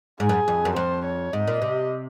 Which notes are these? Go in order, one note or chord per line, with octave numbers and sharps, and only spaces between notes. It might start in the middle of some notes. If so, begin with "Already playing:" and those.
G#2 G#4
F#2
F2
F#2
F2 C5
C#5
G#2 D#5
A#2
C3